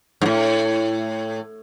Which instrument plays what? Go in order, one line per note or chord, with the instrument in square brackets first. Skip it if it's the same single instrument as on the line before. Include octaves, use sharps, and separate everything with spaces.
[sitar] G#2
A2